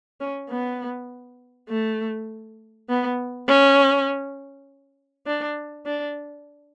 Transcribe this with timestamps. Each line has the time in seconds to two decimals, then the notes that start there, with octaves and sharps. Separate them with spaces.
0.21 C#4
0.50 B3
1.69 A3
2.89 B3
3.48 C#4
5.27 D4
5.86 D4